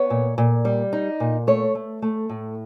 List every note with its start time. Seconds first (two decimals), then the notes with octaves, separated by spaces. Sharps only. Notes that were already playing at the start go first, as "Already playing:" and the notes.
Already playing: B3 C#5
0.10 A#2
0.38 A#2
0.65 G3
0.93 D#4
1.20 A#2
1.47 A3 C#5
1.75 A3
2.02 A3
2.29 A2